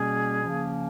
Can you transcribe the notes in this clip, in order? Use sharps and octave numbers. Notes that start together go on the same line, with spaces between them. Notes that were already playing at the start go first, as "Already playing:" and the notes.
Already playing: B2 G3 A#3 C#4 G#4
C#3 F3 A#3 C#4